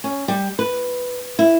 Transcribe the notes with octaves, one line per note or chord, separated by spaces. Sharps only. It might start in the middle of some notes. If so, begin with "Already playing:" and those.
C#4
G3
B4
E4